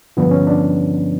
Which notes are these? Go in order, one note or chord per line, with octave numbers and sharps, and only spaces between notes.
G2 D3 F3 B3
C#4
D4